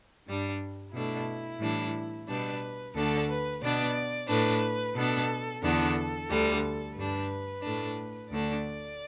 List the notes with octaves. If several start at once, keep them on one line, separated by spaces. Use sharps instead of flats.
G2 G3 D4
B2 A3 D4 E4
A2 E3 G3 D4
B2 G3 D4 B4
D2 D3 A3 D4 A4
B4
B2 B3 D4 D5
A2 A3 D4 B4
B2 B3 D4 A4
E2 D3 B3 D4 A4
D2 D3 G3
G2 G3 D4 B4
A2 A3 D4
D2 D3 A3 D4 D5